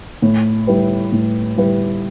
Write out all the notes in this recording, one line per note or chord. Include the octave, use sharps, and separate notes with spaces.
A2
G3 E4 G4 B4
A2
G3 E4 G4 B4